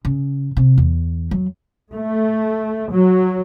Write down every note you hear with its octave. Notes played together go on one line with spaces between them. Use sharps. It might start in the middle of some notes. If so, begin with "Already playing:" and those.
C#3
C3
E2
F#3
A3
F#3